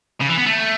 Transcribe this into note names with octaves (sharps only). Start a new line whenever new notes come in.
C#3
E3
B3
A3